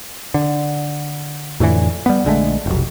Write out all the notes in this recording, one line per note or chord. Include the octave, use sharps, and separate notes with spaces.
D3
F2 A2 D3 E3
G3 B3
A#1 D3 G#3 A3
F1 B1